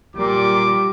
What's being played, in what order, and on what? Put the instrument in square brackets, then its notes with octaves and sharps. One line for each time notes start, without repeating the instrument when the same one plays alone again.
[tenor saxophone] A#2 [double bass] G3 [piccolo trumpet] D6